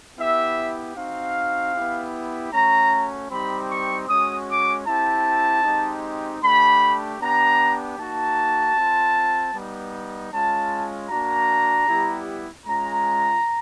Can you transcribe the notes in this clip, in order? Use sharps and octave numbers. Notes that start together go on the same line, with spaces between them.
B3 E4 G4 E5
C4 D#4 F#4 F5
B3 E4 G4
A3 C#4 F#4 A#5
G3 C4 D#4 G4 B5
C#6
G#3 C#4 F#4 D#6
D6
C4 E4 G4 A5
G#3 C4 D#4 G4
A3 D4 G4 B5
B3 D4 G4 A#5
A#3 D#4 F#4 A5
C4 F4
G3 B3 D#4
G#3 C#4 F4 A5
A#3 D4 F#4 A#5
G3 B3 E4 G4
G#3 C#4 F4 A#5